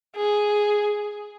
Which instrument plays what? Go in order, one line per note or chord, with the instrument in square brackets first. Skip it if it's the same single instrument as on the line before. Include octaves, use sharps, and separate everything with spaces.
[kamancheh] G#4